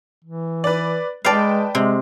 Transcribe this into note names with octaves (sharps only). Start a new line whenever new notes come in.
E3
B4 D5
G#3 B4 D5 F5 G5 A5
C3 G#3